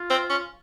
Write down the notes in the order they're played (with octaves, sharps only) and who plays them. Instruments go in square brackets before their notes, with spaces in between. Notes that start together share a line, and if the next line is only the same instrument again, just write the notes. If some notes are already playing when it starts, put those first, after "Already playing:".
Already playing: [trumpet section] F4
[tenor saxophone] C4
C#4